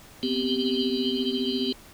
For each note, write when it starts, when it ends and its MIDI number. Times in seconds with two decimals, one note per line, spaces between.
0.23 1.72 59
0.23 1.72 60
0.23 1.72 67